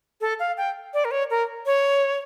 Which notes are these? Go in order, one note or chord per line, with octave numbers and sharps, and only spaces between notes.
A4
F5
G5
D5
A#4
C#5
A#4
C#5